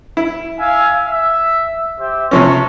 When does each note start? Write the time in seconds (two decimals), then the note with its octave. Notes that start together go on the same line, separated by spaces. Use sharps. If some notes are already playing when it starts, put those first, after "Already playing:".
0.17 E4
0.59 E5 F5 G#5
1.06 E5
1.99 G4 C5 E5
2.31 C3 F3 C#4 C#6